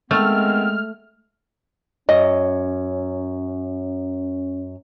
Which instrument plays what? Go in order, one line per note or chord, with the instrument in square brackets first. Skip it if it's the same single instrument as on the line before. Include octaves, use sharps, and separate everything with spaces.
[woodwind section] D#3 B3 C4 [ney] G#3 [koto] A3 [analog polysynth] F6
[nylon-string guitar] F#2 [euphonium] C#4 [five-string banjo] D#5